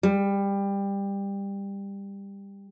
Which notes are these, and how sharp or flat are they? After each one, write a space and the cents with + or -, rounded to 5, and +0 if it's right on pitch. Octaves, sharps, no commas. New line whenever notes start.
G3 +20